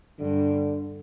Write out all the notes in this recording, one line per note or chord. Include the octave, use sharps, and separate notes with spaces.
G2 D3